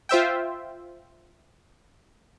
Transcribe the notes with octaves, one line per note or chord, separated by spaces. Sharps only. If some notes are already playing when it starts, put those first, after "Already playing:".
F4 C5 E5 G5